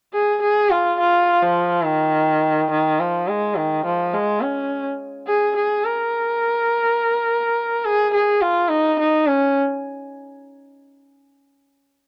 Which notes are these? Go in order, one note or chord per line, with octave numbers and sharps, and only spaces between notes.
G#4
G#4
F4
F4
F3
D#3
D#3
F3
G#3
D#3
F3
G#3
C#4
G#4
G#4
A#4
G#4
G#4
F4
D#4
D#4
C#4